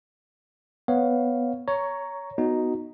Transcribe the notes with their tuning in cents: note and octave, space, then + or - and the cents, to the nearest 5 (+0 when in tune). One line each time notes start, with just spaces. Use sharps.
B3 +0 C#5 +0 F5 +0
C#5 +15 A#5 +0 C#6 +0
B3 +0 D#4 +0 F#4 +0